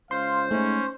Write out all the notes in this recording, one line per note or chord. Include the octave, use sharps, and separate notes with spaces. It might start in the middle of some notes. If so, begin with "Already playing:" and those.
C#2 C5 F5 C6
G#2 A3 C#4